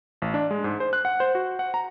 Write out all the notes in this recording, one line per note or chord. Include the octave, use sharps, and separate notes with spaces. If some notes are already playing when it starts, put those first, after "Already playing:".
A1
D4
G#3
G#2
C5
F#6
F#5
C5
F#4
F#5
A#5